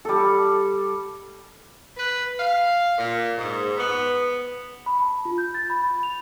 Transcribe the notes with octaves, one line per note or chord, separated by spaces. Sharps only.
G3 A4
B4
F5
A#2
G#2
B3
B5
A5
F4
G6
A6
B5
F7